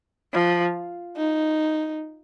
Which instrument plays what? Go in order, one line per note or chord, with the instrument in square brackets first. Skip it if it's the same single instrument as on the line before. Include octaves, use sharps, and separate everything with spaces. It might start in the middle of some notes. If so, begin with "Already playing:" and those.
[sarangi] F3
[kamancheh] D#4